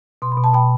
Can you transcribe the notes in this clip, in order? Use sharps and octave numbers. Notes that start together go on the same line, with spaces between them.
B2 C6
B5
B2
A5
B2 G5 B5